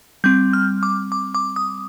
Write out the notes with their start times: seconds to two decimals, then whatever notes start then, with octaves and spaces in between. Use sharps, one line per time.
0.24 G3 C4 G6
0.53 F6
0.83 D6
1.12 D6
1.35 D6
1.56 D#6